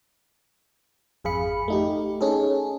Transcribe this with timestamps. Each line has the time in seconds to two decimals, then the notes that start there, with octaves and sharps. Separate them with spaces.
1.24 G#1 F2 G#4 F5 B5 C#7
1.68 A3 D#4 G4
2.21 C#4 D#4 G#4 A4